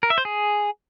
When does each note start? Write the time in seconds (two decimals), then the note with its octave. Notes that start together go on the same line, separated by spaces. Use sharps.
0.03 A#4
0.10 E5
0.18 C5
0.25 G#4